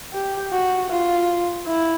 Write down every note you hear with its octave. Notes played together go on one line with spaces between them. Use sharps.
G4
F#4
F4
E4